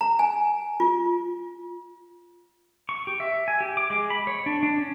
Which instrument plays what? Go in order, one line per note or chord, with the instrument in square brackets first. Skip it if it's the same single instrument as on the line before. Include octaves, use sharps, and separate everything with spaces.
[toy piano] A#5
G#5
F4
[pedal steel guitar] C#6
G4
E5
G#5
G4
D6
G#3
B5
C#5
D4
D4
C#4